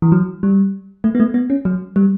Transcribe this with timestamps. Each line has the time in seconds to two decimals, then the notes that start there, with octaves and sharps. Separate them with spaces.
0.02 E3
0.12 F#3
0.43 G3
1.04 A3
1.15 B3
1.20 A3
1.34 B3
1.50 C#4
1.65 F#3
1.96 G3